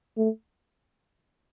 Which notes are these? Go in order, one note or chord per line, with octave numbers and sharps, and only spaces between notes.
A3